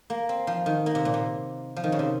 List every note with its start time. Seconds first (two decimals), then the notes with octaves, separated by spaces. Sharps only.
0.10 A#3
0.29 C4
0.47 F3
0.66 D#3
0.86 A#3
0.95 C3
1.05 A#2
1.14 C3
1.76 F3
1.84 D#3
1.92 C#3
1.99 C3